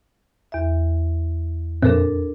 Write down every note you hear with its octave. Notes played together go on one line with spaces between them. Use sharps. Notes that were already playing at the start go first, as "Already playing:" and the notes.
E2 E5
F2 A#2 C4 D4 A4 A#4